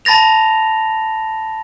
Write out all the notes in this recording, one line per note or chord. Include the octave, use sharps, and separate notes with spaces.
A5 B5 A6 A#6 F7